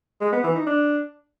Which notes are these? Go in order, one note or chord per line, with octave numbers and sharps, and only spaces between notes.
G#3
B3
E3
D#4
D4